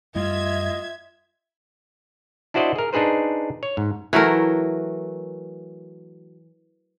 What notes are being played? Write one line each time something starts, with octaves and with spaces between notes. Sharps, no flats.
F#2 G3 A3 F4 D#5 E5 G#6
D4 E4 F#4 C5 D5 D#5
G#4 A#4
D4 D#4 G#4 B4 C5
C#5
G#2
E3 F#3 A3 A#4